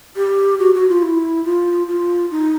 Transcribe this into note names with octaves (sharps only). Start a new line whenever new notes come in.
G4
F#4
F#4
F4
E4
F4
F4
D#4